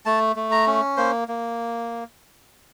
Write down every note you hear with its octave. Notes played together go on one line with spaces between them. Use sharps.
A3 A5
A3
A#5
C#4
A#3 C5
A#3